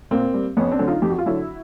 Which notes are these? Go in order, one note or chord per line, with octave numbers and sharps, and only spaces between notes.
A#2 A#3 C4
G3
F2 B3 C#4
C4 D4
D3 F#3
D#4 F4
F2 G4
F#4
F4
D3 F#3 E4 F#4